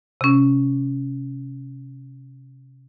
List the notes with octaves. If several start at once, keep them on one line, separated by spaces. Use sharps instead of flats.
C3 C#4